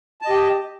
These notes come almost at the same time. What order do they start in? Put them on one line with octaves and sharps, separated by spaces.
A5 D#5 G4